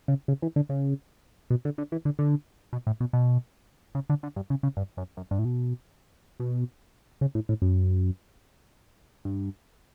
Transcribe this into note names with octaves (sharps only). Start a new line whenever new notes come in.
C#3
C#3
E3
D3
C#3
B2
D3
D3
E3
D3
D3
B2
A2
B2
B2
C#3
D3
D3
G2
C#3
C#3
G2
F#2
F#2
G2
A2
B2
B2
C#3
A2
A2
F#2
G2